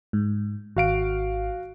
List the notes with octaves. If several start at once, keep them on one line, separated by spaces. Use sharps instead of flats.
G#2
G#1 F#4 F5 D7